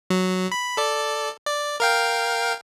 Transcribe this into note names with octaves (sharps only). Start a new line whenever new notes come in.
F#3
B5
A4 D5
D5
A#4 F5 G5